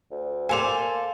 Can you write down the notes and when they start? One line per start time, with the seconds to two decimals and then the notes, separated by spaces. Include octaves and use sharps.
0.11 D2
0.49 A#3 A4 C5 D5 G#5 F7